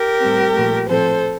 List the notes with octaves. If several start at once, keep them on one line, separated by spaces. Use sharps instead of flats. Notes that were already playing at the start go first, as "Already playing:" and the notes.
Already playing: G4 A#4
A2 G3 C4
A#2 F3 A3
A2 F3 C4 A4 C5